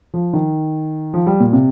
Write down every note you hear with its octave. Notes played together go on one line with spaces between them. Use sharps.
F3
D#3
F3
G3
A#2
C3